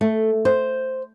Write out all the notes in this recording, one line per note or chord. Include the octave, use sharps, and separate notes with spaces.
A3
C5